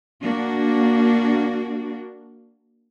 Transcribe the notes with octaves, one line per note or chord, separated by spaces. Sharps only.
A#3 D4 F#4